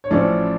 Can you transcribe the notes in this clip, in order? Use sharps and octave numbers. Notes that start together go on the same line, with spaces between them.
C#5
A1 A2 F3 A3 C#4 D5